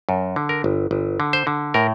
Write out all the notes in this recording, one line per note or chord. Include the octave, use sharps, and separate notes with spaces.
F#2
D3
A#4
G1
G1
D3
C5
D3
A2 A#4